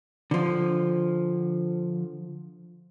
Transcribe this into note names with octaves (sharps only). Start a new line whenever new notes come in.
D3 F3